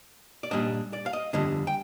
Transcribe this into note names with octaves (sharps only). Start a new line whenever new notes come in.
D5
A#2 G3 D4 D#5
D5
F5
D#5
F2 D3 G3 D4 D#5
G5